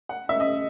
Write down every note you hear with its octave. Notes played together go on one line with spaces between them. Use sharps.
F#5
E5
D#5